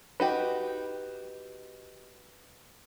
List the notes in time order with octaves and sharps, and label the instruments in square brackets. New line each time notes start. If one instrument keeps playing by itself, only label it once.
[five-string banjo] D#4 F#4 G4 [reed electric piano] B4